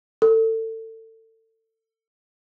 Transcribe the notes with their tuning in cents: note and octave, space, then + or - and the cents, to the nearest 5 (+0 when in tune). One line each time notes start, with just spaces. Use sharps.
A4 +30